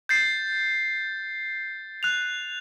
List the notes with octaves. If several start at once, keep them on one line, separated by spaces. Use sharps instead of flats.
G6 A6 C7
F#6 F7